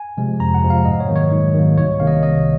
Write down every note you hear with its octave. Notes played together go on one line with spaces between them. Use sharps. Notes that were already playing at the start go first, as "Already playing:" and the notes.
Already playing: G#5
C3 F3 G#3
F2 A#5
F#5
C3 F3 G#3
F5
G#2 D#5
C#5
D#3 F#3 A#3
C#5
G#2
D#3 F#3 A#3
C2 C#5
C3 D#3 A#3 F5
D#5
C2 D#5